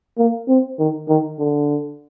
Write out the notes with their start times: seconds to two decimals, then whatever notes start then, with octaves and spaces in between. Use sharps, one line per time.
0.19 A#3
0.48 C4
0.79 D#3
1.09 D#3
1.39 D3